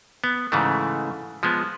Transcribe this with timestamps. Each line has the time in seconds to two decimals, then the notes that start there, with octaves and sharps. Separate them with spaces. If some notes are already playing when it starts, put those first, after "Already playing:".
0.24 B3
0.52 G#2 C#3 E3 A3
1.43 F3 G#3 B3